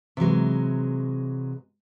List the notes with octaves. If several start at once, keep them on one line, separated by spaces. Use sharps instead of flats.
C3 E3 F#3 G#3